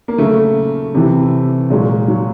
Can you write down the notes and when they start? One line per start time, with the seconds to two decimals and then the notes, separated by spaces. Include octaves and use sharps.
0.08 A#3
0.18 C#3 F#3 A3
0.94 C3 E3
1.70 A#2 F#3 G#3
2.08 F#3